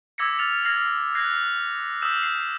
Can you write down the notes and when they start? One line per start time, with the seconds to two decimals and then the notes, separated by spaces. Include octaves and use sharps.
0.18 D6 E6 G#6 A#6 B6 C#7
0.39 F6 A6 C#7 F7
0.65 F6 G#6 A#6 C7 F#7
1.15 F#6 G#6 A#6 C7
2.02 D#6 E6 G6 B6 E7
2.20 C7 F#7